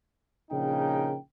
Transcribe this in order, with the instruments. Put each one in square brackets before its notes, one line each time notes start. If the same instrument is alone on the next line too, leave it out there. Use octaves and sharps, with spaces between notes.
[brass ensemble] A#1 C#3 D#4 A#4 G5